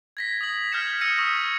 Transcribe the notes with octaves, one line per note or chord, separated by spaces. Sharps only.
G#6 A#6 B6
D#6 F#7
F6 G6 G#6 B6 C#7 E7
D#6 E6 G6 A#6 C#7 D#7
C#6 D#6 E6 A#6
G#6